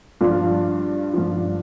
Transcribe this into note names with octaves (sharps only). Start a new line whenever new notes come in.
G2 F3 D4 F4
G2 F3